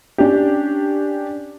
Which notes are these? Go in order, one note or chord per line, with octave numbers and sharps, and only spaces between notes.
C#4 D4 G4